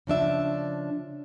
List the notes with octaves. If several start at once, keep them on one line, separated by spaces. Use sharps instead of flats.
C#3 F3 D4 E5